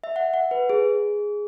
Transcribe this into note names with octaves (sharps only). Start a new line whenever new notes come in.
E5
F#5
F#5
B4
G#4